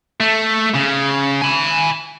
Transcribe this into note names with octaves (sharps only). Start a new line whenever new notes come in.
A3
C#3
G#5 B5